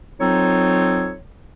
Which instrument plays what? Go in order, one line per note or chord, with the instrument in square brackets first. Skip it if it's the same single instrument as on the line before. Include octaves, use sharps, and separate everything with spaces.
[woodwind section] F#3 C4 D#4 F4 A4 C#5